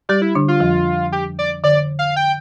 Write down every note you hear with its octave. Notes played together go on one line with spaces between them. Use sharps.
G3 G4 D5
E4
D3 D4
F4
F2 F3
G4
D5
D3 D5
F5
G5